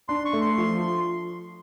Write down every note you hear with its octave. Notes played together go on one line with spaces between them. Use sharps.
D4 C6
C#6
A3
C6
F3